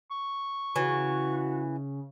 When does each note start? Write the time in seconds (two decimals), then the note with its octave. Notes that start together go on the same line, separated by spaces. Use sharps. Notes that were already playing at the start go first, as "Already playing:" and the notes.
0.11 C#6
0.76 C#3 E3 F#4